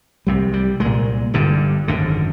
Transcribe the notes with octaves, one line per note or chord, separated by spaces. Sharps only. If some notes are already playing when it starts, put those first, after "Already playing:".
C2 C3 G3
G3
C2 A#2 G#3
G1 G2 D3
G#1 F#2 D3